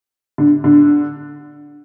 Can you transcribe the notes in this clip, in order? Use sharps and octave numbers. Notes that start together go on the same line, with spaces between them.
D3
D3